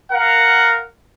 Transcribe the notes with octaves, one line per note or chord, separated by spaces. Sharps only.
A#4 F5 F#5